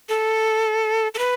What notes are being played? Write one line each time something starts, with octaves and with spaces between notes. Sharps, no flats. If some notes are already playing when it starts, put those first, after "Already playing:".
A4
A4
B4